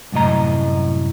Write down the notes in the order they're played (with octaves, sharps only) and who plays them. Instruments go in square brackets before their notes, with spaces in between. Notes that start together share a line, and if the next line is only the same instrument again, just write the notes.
[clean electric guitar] C2 F#2 A2 D#5 A#5